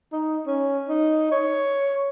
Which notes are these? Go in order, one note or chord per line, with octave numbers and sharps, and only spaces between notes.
D#4
C#4
D#4
C#5